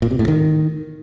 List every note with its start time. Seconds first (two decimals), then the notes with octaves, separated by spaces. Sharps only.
0.02 A#2
0.11 C3
0.19 A2
0.28 D#3